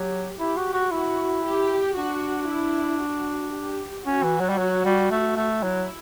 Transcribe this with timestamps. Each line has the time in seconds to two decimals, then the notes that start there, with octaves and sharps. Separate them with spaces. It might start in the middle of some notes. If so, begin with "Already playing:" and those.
Already playing: F#3 G4
0.39 E4 G4
0.57 F#4
0.74 F#4
0.91 E4 F#4
1.44 G4
1.96 D4 F#4
2.48 E4
3.01 F#4
3.53 G4
4.06 C#4 F#4
4.23 E3
4.40 F#3
4.49 G3
4.58 F#3
4.85 G3
5.11 A3
5.36 A3
5.63 F#3 E4